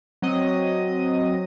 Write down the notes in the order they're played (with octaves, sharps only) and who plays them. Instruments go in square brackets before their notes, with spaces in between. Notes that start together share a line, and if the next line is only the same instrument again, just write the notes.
[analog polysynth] F#3 C4 D#5 D#6